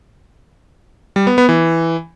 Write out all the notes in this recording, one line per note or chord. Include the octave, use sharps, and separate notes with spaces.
G3
B3
B3
E3